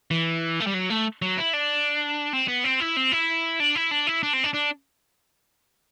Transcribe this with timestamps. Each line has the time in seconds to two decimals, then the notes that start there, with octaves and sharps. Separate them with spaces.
0.11 E3
0.60 A3
0.67 G3
0.74 F#3
0.90 A3
1.22 F#3
1.38 E4
1.54 D4
2.33 C4
2.48 B3
2.64 C4
2.80 E4
2.97 C4
3.12 E4
3.60 D4
3.76 E4
3.91 D4
4.07 E4
4.23 D4
4.33 C4
4.44 D4
4.54 D4